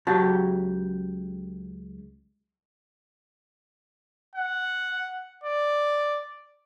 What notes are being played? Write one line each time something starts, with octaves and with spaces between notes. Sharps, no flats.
C#2 F#3 F#4 G4 C#5 A5
F#5
D5